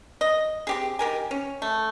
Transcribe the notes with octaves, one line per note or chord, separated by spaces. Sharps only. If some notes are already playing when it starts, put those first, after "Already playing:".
D#5
C4 G4 G#4
D#3 G4 A#4 G#5
C#4
A3